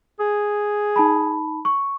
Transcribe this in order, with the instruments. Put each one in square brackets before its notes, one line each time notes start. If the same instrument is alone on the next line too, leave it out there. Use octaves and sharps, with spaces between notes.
[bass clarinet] G#4
[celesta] D#4 A5 B5
C#6